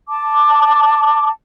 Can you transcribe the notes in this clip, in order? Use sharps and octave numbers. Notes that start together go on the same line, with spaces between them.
A5 D6